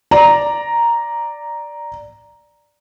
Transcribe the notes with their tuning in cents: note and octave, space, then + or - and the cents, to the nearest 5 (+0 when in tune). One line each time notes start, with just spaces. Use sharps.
D5 +0 A#5 +0